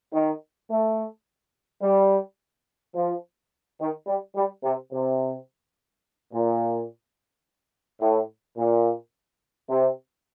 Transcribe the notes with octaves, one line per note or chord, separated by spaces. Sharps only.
D#3
A3
G3
F3
D#3
G3
G3
C3
C3
A#2
A2
A#2
C3